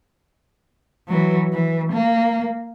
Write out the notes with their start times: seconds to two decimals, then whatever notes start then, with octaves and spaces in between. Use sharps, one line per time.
1.08 E3 F#3
1.53 E3
1.93 A#3